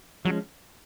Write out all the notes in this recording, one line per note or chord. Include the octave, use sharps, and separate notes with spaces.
F3 F#3 G#3 C#4